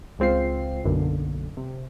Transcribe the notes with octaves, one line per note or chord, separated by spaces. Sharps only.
C#2 G#3 C4 F4 C7
B1 F#2 D3 A#3
C3